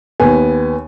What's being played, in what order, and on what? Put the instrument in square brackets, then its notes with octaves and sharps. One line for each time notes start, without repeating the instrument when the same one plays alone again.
[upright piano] D#2 G#5 [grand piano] B3